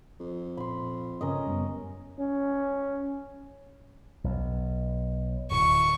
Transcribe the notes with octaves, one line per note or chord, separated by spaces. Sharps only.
F2
A#2 B5 C6
G2 C#3 C#4 A#4 D#5
F#2 G3 B3
C#4
B1
D1 C#6